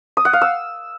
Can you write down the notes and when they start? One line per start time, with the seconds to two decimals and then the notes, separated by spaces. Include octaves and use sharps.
0.17 D#6
0.25 F#5
0.33 F5
0.41 E6